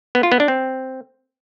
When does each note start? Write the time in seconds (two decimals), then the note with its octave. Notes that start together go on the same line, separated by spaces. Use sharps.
0.15 B3
0.23 F4
0.32 B3
0.40 D4
0.48 C4